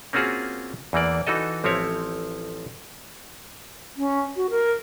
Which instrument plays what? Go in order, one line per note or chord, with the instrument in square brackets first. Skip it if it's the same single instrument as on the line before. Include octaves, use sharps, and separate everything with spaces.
[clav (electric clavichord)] A#3 C4 C#4 F4 F#4 G#4
E2 E3 A#3 D5
E3 D#4 F#4 A4 D#5
A1 F3 C4 E4 C#5
[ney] C#4
F#4
A#4